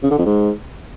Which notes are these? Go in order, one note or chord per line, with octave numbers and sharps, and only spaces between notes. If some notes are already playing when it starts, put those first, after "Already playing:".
C#3
D3
F2
G#2